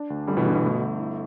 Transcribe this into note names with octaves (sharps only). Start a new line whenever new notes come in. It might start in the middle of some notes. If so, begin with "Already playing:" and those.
Already playing: D4
D2
G1 D3 G3
B2 E3
G1 D3
B2
A3
G1
E4